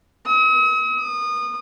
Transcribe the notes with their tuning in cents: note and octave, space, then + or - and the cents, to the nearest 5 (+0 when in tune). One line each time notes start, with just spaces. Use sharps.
D#6 +45
D#6 -30